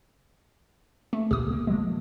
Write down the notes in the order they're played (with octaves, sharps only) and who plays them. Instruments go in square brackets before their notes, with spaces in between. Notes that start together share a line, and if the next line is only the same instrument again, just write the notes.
[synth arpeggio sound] A3
[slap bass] C#2 A#2 [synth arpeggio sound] G4 D#6
[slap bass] A#3 B3
[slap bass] F3 A#3 [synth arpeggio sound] G#3